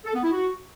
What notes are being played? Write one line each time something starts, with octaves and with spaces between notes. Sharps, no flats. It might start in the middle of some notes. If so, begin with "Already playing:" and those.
A4
B3
E4
F#4